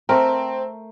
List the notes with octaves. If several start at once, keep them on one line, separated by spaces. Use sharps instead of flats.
A3 C4 A#4